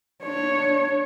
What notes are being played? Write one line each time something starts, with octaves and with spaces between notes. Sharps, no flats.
D4 C#5